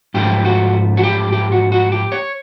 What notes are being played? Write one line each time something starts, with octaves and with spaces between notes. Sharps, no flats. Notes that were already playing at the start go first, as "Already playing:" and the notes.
G#2 F3 A3 G4
F#4
F#4
G4
G4
F#4
F#4
G4
C#5